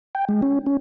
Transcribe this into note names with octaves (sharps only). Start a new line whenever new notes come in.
G5
G#3
C#4
C#4